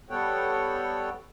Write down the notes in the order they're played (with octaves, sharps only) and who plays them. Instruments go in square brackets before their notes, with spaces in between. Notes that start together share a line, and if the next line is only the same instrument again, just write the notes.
[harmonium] G3 B3 A4 C#5 F#5 G5